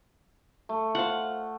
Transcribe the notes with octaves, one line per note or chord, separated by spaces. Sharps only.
A3
F4 C5 F5 F#5